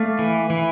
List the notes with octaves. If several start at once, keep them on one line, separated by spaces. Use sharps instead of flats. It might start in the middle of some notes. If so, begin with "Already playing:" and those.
Already playing: A3 D5 F5
E3
E3